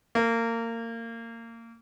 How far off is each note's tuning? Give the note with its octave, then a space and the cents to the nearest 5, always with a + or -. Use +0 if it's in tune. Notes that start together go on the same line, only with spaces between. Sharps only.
A#3 -25